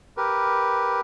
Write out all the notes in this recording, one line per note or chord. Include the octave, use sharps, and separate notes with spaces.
G4 A#4 B4